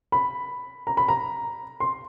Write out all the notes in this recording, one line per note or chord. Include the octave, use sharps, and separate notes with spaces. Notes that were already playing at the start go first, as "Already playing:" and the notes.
B5
A#5
B5
A#5
C6